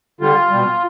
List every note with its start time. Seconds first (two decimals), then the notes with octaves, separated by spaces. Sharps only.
0.21 D3 G3 F4
0.50 B2 G3